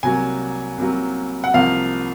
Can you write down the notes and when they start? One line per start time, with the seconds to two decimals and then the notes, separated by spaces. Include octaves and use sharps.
0.03 C2 C3 F#3 A#3 G#5
0.78 C2 C3 F#3 A#3
1.44 F#5
1.54 C2 C3 F3 A#3 F5